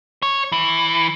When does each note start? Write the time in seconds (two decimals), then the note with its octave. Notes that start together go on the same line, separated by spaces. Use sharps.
0.23 C#5
0.52 E3